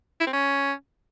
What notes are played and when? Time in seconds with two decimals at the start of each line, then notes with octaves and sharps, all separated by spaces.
0.20 E4
0.27 C4
0.33 C#4